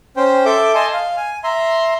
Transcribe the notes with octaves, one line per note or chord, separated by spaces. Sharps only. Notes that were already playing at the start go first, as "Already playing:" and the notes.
C#4 C5 G5
A4 E5 D6 G6
D#5 G#5 A5 C6
F5
G#5
E5 A#5 C6